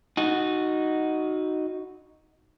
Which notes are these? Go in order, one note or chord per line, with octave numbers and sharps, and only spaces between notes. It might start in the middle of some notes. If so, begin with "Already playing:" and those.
D#4 F#4